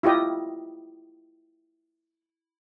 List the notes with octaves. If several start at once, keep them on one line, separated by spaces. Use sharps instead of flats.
E4 F4 G4 D#5